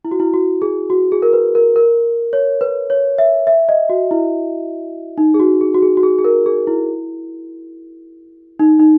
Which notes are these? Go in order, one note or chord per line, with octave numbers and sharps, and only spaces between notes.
E4
F#4
E4
F#4
G#4
F#4
G#4
A#4
B4
A#4
A#4
C#5
B4
C#5
E5
E5
D#5
F#4
E4
D#4
G#4
F#4
G#4
F#4
G#4
F#4
G#4
G#4
A#4
G#4
E4
D#4
D#4